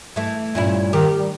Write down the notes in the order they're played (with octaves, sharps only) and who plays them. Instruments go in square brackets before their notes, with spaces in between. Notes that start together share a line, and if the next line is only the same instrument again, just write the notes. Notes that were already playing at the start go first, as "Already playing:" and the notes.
[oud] E3 A3
[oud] G2 C#4 E4 [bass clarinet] A#2
[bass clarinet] D#3 [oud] G4
[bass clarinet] G3